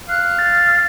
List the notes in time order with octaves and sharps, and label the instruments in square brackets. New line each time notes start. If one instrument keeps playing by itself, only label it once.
[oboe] F5 [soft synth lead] F#6
[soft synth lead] A6